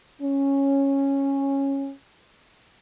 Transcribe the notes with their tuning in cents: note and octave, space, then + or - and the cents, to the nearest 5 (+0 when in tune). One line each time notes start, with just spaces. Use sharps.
C#4 -10